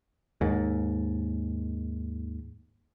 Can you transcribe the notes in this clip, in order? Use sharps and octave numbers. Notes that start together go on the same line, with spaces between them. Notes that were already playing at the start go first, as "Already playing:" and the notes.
D#2 G#2